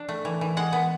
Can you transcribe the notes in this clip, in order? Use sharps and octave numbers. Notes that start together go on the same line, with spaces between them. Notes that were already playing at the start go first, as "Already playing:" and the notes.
Already playing: D4
A3
E3
E3
G#3 F#5
B3